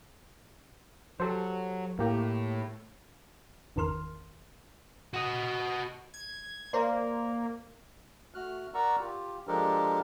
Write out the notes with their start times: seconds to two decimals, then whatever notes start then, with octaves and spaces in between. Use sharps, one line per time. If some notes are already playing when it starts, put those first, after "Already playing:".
1.20 F#3 G4 A4 C5
1.99 A2 A#3 G4
3.76 G1 E2 D#3 A#4 C6 F6
5.14 F#4 D#5
6.14 G#6
6.73 A#3 A#4 C5 D5
8.34 A3 F#4 F6 F#6
8.74 A#4 D5 F#5 A#5 C#6 E6
9.00 F4 G4
9.47 F3 G#3 D4 G4 A4 A#4